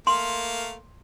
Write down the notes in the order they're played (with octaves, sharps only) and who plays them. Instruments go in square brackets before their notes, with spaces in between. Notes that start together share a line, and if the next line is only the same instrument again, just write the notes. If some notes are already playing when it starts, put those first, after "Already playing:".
[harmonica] A3 A#3 F5 [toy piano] C6